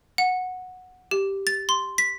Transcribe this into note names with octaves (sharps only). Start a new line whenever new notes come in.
F#5
G4
A6
C6
B6